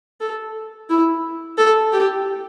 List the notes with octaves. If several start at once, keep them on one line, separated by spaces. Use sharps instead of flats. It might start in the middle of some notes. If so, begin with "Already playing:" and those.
A4
E4
A4
G4